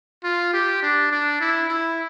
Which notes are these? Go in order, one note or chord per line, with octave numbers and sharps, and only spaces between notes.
F4
G4
D4
D4
E4
E4